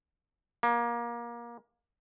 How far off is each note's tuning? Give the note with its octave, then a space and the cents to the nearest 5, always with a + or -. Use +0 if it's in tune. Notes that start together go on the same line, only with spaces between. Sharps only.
A#3 +25